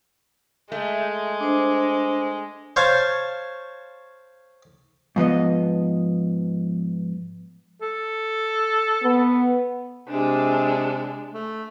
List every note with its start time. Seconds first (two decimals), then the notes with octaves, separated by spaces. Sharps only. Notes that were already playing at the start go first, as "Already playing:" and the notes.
0.72 G#3 A3
1.41 D4 C5
2.76 C5 C#5 F5 A5
5.16 G#2 F3 B3 D#5
7.82 A4
9.03 B3
10.08 C3 G#3 D4
11.34 A3